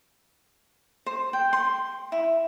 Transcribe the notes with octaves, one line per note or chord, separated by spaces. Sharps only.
C5
G5
C6
E4